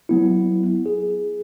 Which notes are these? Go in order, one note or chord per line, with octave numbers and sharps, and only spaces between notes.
F#3 B3 E4
G#4